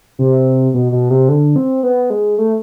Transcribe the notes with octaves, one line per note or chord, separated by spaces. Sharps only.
C3
B2
B2
C3
D3
C4
B3
G#3
A3